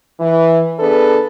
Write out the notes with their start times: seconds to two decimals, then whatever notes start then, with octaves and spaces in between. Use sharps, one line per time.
0.20 E3
0.79 B3 D4 G#4 A4 B4